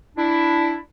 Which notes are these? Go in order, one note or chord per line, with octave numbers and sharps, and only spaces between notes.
D4 E4